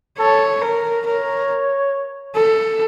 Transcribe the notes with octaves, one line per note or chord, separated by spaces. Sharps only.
A4 C#5
A#4
A#4 C#5
A4